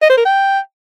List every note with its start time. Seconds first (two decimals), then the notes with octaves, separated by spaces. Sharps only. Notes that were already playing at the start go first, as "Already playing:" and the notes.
0.02 D#5
0.09 C5
0.17 A#4
0.25 G5